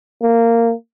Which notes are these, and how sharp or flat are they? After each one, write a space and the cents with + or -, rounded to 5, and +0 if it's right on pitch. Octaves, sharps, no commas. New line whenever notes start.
A#3 -15